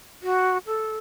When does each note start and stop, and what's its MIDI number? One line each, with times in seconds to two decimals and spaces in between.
0.23 0.58 66
0.67 0.97 69